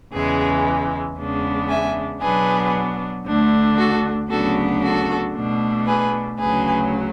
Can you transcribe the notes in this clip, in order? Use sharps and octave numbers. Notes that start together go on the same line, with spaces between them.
E2 C#3 E3 G#3 G#4
E2 C#3 G#3 B3 D4
E5 G#5
B2 F#3 B3 D4 G#4 B4
D2 D3 A3 D4
F#4 A4
D2 C#3 F#3 B3 D4 F#4 A4
F#4 A4
B2 A3 D4
G#4 B4
D2 C#3 F#3 G#4 B4